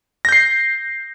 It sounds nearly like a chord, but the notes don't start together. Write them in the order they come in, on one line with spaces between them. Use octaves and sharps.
A#6 G6 C7